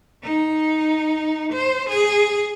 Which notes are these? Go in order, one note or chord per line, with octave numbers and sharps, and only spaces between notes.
D#4
C5
G#4